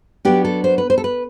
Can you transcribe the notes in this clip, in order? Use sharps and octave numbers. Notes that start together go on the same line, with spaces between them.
F#3 B3 D4 G4
A4
C5
B4
C5
A4
B4